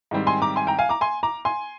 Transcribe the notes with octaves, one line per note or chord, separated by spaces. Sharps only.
G#2 D#3 G3 C4
G#5 C6
A#5 D6
G#5 C6
G5 A#5
F5 G#5
A#5 D6
G#5 C6
A#5 D6
G#5 C6